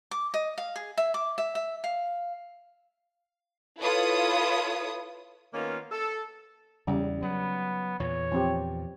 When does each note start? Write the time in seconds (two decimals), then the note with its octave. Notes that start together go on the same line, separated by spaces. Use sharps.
0.11 D6
0.34 D#5
0.58 F5
0.76 G#4
0.97 E5
1.14 D6
1.38 E5
1.55 E5
1.84 F5
3.81 E4 F4 A4 B4 C#5 D#6
5.54 D#3 A#3 B3 C#4 D#4 F4
5.91 A4
6.87 E2 C#3 G3
7.22 F#3 B3
8.00 E2 A#2 C#5
8.32 F3 C4 G4